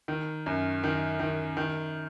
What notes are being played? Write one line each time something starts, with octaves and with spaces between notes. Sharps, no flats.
D#3
F#2
D#3
D#3
D#3